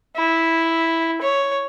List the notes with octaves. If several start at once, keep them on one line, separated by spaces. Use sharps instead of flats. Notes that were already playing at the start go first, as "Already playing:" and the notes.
E4
C#5